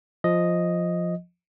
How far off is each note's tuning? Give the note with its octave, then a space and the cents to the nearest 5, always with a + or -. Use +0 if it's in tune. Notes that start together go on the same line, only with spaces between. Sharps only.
F3 +0 D#5 +0